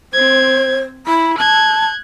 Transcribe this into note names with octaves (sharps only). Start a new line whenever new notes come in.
C4 C5 G#6
E4 B5
A5 F#6 G#6